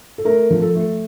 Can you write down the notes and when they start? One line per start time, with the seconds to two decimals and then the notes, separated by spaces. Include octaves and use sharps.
0.18 A4
0.25 A3 A#4
0.50 F3
0.62 A4
0.75 A3